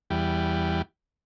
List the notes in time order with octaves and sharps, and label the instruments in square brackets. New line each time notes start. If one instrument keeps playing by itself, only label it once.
[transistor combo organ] E2 G3